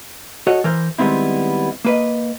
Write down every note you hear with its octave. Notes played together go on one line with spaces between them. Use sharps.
F#4 A4 C#5 D#5
E3 A#4 C5
D#3 G3 G#3 B3 C4 E4
A#3 B4 D#5